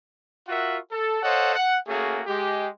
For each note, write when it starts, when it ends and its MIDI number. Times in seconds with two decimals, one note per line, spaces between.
0.48 0.77 65
0.48 0.77 66
0.48 0.77 70
0.48 0.77 76
0.48 0.77 78
0.92 1.22 69
1.23 1.54 69
1.23 1.54 72
1.23 1.54 73
1.23 1.54 75
1.23 1.54 77
1.23 1.54 78
1.55 1.76 78
1.87 2.20 57
1.87 2.20 58
1.87 2.20 61
1.87 2.20 66
1.87 2.20 68
2.27 2.67 56
2.27 2.67 67